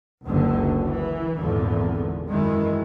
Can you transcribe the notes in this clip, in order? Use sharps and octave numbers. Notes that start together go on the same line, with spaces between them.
F#1 C#2 F#2 D3
E3
G#1 E2 A#2 D3
F#2 D#3 E3 G#3